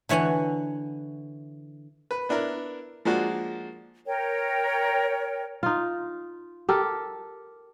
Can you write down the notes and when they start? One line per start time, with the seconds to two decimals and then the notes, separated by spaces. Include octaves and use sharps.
0.09 D3 E3 C#5 F#5 G#5
2.11 B4
2.29 B3 D4 E4 A#4
3.05 F3 G#3 A#3 D4 F#4
4.06 A#4 C#5 G5
5.63 D#4 F4
6.69 G4 A4 A#4